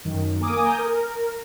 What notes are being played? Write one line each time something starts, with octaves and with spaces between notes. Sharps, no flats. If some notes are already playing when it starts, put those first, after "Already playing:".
F#2 D#3
A#3 A#4 G#5 D6 D#6
G#5 A#5 D#6 G6
A#4